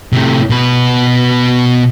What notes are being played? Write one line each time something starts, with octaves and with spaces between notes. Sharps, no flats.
A2 C3
B2 B4